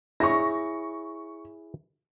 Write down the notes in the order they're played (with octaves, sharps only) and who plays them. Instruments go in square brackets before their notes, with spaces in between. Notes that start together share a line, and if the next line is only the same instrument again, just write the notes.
[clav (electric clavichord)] E4 G#4 C#5 [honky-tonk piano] C#6 A#6